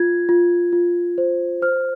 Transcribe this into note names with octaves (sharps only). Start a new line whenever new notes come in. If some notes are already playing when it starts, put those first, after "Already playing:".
Already playing: F4 G#6
F4
F4
C5
C5 F6